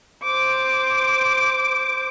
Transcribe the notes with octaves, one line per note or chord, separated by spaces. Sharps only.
C5 D6